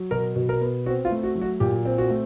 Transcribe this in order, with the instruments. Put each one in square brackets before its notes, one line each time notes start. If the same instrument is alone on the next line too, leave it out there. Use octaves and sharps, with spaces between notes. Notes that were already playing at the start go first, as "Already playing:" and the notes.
Already playing: [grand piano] F#3
B2 A#4
B2
A#4
B3
C4 F#4
F4
A3
F#4
F#3
F#4
A#2 G4
C4
F#4
A3